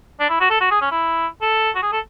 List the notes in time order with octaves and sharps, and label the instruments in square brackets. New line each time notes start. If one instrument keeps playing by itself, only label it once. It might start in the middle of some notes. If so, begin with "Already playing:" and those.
[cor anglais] D4
E4
F#4
A4
F#4
G#4
C#4
E4
A4
F#4
G#4
A4